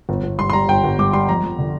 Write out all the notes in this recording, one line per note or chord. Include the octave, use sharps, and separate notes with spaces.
G1
G1
G2 C6
C6
G3 A#5
G1 G5
G1
G2 D6
G3 C6
F2 A#5
F2
D3